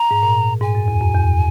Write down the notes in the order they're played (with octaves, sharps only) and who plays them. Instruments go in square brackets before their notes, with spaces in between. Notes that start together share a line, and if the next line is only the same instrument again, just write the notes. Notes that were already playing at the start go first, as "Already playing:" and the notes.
Already playing: [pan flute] A#5
[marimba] G#2
A#2
[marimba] G#2 [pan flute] G#5
[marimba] F#2
E2
F#2
E2